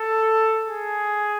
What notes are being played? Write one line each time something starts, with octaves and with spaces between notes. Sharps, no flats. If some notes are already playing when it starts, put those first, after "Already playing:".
Already playing: A4
G#4